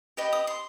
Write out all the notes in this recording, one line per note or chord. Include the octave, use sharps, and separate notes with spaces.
G4 B4 D#5
D#6
C6